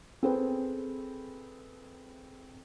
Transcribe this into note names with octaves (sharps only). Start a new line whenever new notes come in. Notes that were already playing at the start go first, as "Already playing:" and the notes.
C4 G#4 A4 B4 C5